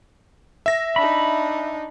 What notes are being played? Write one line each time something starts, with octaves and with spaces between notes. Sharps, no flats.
E5 A#6
D4 D#4 B5